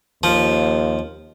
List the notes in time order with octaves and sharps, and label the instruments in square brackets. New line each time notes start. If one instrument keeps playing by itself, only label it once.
[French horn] D#2 [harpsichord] F3